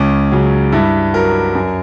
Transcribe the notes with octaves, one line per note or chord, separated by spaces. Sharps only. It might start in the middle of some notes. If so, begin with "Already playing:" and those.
Already playing: C#2 C#4
C#3 F#3
G2 E4
F#3 A#4
F#2